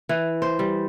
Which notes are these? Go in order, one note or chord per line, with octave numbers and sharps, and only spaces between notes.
E3
C5
G3